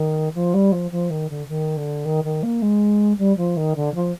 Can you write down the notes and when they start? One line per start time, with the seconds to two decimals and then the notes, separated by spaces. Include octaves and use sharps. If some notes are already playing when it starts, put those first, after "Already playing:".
Already playing: D#3
0.35 F3
0.54 G3
0.72 F3
0.91 F3
1.10 D#3
1.30 D3
1.48 D#3
1.77 D3
2.05 D#3
2.24 D#3
2.43 A#3
2.62 G#3
3.18 G3
3.37 F3
3.57 D#3
3.76 D3
3.95 F3